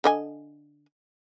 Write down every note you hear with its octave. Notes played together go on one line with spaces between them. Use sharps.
D3 D#5 G#5